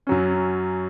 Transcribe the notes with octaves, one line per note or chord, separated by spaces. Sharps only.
F#2 F#3 C#4